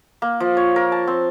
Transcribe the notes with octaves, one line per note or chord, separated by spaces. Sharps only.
A#3
F3
C#5
A#4
A5
C4